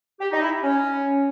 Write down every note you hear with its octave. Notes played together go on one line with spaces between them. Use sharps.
G4
D#4
E4
C#4